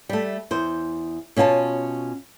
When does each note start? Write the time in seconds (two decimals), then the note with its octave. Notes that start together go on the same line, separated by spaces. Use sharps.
0.09 G3 A3
0.51 E2 C5
1.37 B2 C#4 F4 G#5 A5